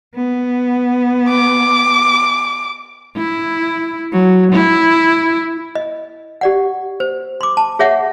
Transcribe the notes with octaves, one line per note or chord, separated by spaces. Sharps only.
B3
D6
E4
F#3
E4
D#5
G4 D5 F#5
C5
C6 D6
A5
G#4 C#5 E5 F#5